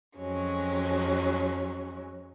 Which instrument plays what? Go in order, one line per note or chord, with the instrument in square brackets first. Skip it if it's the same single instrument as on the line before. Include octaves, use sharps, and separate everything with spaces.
[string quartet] F2 F#3 G#3 C#4